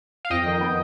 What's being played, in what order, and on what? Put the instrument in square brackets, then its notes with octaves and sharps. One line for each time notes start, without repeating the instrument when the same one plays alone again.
[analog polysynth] F5
F2 D#5 G5
D#3
B3